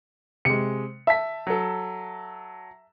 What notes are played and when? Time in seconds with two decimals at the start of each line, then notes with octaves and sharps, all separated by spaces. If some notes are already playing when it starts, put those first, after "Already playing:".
0.45 C3 G#3 C#7
1.07 E5 A5 B6
1.47 F#3 A4